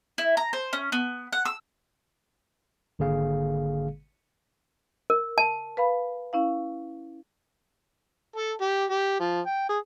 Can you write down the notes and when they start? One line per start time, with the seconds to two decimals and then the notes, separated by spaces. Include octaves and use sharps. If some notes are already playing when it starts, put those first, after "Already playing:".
0.18 E4
0.37 A#5
0.53 C5
0.73 C#4
0.92 B3
1.32 F#5
1.45 E6
2.99 G#1 D3 A#3 G#4 F5
5.10 A#4
5.38 A5
5.77 B4 F5 B5
6.33 C#4 E4 F5
8.36 A4
8.61 G4
8.90 G4
9.20 F3
9.46 G5
9.69 G#4